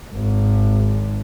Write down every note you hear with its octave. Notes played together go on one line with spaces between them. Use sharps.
G#1